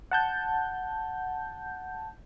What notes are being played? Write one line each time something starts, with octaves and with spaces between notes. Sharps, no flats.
F#5 A5 G6